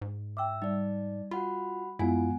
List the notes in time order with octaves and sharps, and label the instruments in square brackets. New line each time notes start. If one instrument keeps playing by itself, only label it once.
[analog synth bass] G#2
[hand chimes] E5 E6 [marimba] G5 D6
[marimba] G3 [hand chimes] D#4 D5
[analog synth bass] F4 [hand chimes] F#4 F#5 B5
[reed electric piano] F#2 F4 [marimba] G#3 B3 [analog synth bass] E4 [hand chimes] F#5 G#5